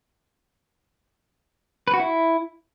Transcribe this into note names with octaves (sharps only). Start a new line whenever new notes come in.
B4
F#4
E4